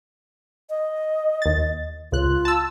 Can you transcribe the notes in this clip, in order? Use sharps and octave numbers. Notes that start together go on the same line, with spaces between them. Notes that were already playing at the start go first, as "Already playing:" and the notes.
D#5
D#2 A6
C#2 F4 F#6
A5 E6